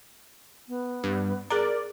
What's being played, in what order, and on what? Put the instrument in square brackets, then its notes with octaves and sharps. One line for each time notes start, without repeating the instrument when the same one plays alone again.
[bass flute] B3
[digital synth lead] G2
[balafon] G#4 A#5 [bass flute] A#4 [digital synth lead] D5